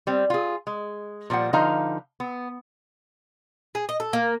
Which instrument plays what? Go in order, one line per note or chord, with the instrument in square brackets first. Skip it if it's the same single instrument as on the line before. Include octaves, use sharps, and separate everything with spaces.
[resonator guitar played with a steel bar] G3 C4
F4 G#4
G#3
A#2 F3 G3 F#5
D3 F3 D#4 B4 F5 A#5
B3
[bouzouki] G#4
D#5
A4
A#3